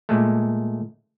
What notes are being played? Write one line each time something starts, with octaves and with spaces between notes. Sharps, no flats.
A#2 G#3 A3